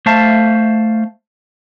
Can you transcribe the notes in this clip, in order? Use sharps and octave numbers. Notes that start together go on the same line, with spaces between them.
A3 C5 E5 F5 A5